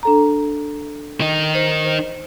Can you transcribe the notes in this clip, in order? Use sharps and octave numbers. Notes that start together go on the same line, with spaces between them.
D4 A4 A#5
D#3 D#4
C5
C5